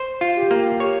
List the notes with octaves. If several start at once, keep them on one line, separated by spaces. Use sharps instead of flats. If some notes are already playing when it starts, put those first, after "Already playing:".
Already playing: C5
F4
G4
A#3
G4 A#4 C#5